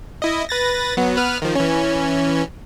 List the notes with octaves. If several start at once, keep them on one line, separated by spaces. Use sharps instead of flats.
E4 D#5
B4 A6 A#6
F#3 B3
B3 B4 F6
D#3 F3
E3 C#4